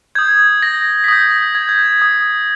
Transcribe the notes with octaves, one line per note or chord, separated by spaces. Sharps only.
D#6 G6 G#6
A#6
B6
D#6 G6 A#6
A#6
G#6
G6
G#6
D#6 G6